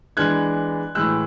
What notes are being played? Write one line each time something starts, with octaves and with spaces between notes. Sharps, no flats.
E3 G#3 B3 D4 F#6 G#6
A2 E3 G#3 E6 F#6